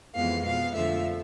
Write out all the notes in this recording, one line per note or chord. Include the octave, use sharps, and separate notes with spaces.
F2 E3 G#3 B3 F5
B2 B3 F5
F2 D3 F3 A3 E5